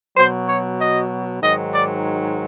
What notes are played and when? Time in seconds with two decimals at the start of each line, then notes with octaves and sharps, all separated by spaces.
0.17 B2 F#3 C5
0.48 C#5
0.79 D#5
1.42 G#2 D#3 F#3 D#5
1.73 D5